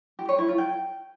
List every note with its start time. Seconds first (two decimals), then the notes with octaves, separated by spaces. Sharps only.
0.19 G4
0.29 C#5
0.38 E4
0.48 F4
0.58 G5